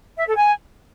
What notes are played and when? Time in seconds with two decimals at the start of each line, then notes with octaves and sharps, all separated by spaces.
0.17 E5
0.26 A4
0.35 G#5